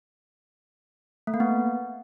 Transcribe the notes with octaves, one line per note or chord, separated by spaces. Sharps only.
A3
A#3
B3